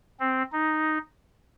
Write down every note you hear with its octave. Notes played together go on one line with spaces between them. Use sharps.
C4
D#4